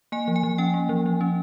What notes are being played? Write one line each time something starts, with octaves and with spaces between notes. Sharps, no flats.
A#3 G#5
F3
G#5
F3
C#4 G5
A#3
F3
F3
C#4